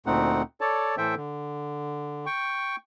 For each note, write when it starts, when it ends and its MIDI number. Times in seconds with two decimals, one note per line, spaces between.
0.06 0.42 38
0.06 0.42 46
0.06 0.42 57
0.06 0.42 60
0.06 0.42 63
0.06 0.42 78
0.61 0.95 69
0.61 0.95 73
0.61 0.95 74
0.61 0.95 81
0.98 1.15 45
0.98 1.15 52
0.98 1.15 69
0.98 1.15 72
0.98 1.15 76
0.98 1.15 79
1.16 2.26 50
2.26 2.76 79
2.26 2.76 85